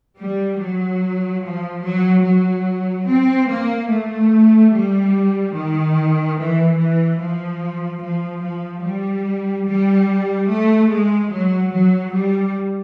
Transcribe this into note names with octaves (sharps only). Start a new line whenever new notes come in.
G3
F#3
F3
F#3
F#3
C4
A#3
A3
G3
D#3
E3
E3
F3
F3
F3
G3
G3
A3
G#3
F#3
F#3
G3